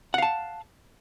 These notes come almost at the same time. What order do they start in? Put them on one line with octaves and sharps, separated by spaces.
F#5 F5 A5